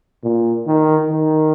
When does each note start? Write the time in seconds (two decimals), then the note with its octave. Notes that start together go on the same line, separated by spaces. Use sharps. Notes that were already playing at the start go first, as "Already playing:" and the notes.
0.23 A#2
0.67 D#3
1.09 D#3